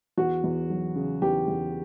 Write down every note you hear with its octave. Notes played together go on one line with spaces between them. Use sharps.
E2 F#4
E2
F#3
C#3
E2 G4
E2